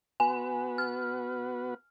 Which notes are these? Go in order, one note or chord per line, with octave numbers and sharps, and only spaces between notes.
B3 F#4 B4 G#5
F6